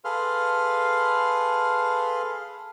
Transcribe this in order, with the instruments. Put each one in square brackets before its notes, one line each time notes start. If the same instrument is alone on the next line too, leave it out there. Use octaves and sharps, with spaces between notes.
[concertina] G#4 A4 B4 F5 C6 F6